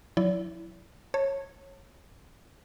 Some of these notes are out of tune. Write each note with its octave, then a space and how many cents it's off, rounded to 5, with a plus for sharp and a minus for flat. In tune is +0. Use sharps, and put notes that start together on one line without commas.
F#3 -35 E4 +0 D5 -40
C#5 -20 A5 +25